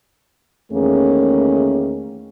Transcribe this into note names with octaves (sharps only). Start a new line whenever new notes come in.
E2 D#3 A3 A#3 C#4 G#4